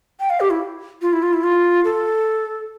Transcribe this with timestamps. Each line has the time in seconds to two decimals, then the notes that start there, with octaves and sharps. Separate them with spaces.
0.20 G5
0.30 F5
0.40 G4
0.50 E4
1.02 F4
1.13 E4
1.23 F4
1.33 E4
1.43 F4
1.84 A4